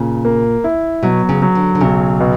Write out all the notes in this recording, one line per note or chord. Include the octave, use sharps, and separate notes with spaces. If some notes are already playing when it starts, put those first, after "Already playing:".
Already playing: A#2 C#3
A#3
E4
B2 F#3
C#3
F#3
D3
D3
B1 C#3
B2